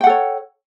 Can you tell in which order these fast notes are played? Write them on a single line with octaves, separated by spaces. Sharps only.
G5 F#5 A4 C#5